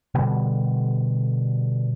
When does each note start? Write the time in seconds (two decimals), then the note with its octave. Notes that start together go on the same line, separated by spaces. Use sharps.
0.15 B2 D3 G3